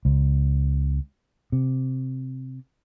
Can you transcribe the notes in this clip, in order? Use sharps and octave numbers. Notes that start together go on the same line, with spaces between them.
C#2
C3